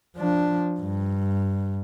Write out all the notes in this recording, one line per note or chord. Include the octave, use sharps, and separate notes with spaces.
F3 D4
G2